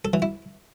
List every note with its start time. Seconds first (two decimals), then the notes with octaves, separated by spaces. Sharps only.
0.05 A4
0.13 E3
0.22 E4